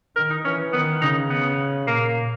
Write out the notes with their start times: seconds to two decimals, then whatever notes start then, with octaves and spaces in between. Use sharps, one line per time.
0.16 D#3 A#4
0.30 D#4
0.44 E3 C#4
0.73 D#3 B3
1.01 C#3 D#4
1.30 B3
1.87 A#2 A#3